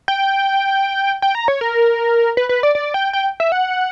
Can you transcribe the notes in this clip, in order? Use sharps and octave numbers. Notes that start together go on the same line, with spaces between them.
G5
G5
A#5
C#5
A#4
B4
B4
D5
D5
G5
G5
E5
F#5